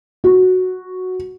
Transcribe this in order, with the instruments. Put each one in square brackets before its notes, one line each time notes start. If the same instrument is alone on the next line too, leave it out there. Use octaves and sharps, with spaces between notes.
[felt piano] F#4